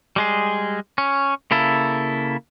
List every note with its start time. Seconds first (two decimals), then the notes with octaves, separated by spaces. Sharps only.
0.16 G3 G#3 G#4
0.98 C#4
1.51 C#3 A#3 E4 A4